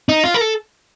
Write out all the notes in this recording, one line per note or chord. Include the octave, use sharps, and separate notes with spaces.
D#4
F4
A#4
A4